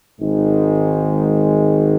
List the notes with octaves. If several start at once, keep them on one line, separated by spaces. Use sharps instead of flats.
G#1 G#2 D#3 G#3